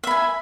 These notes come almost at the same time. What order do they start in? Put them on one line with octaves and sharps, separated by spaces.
E5 B5 G#5